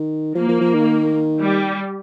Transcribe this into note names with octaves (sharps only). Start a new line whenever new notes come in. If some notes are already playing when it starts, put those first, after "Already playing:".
Already playing: D#3
F3 A#3
F3
F3
D#3
G3